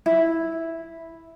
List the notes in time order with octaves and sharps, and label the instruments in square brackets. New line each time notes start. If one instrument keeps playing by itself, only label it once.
[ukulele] E4